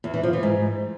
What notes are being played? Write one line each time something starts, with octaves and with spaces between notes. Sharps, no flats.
E2
E3
F3
E3
G#2